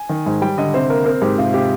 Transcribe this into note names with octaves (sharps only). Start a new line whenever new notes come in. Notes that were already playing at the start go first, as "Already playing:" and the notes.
Already playing: G#5
D#3
G#2
G3 G5
D3 D#5
C3 C5
A#3 A#4
C4 A#4
G#2 G4
C3 F4
C3 G4